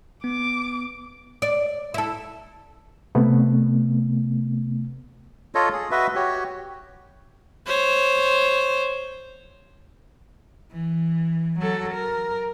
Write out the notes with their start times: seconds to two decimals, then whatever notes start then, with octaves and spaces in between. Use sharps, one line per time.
0.24 B3 D6
1.42 D5
1.94 E4 A4
3.15 C3 A3 B3
5.55 F4 A4 C#5 D#5
5.73 G#4
5.91 F#4 B4 D#5 E5
6.15 F#4 G4 C#5
7.67 C5 C#5
10.71 E3
11.60 F#3 A4
11.94 A#4